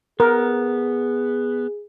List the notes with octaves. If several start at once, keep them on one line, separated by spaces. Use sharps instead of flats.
B3 G#4 A#4